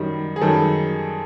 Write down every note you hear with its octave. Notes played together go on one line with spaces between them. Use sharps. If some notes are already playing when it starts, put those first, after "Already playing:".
Already playing: F#2 D#3 G3
G#4
F#2 D#3 G3 A4